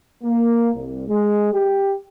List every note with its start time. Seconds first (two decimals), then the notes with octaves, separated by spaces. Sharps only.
0.23 A#3
0.75 C2
1.09 G#3
1.53 G4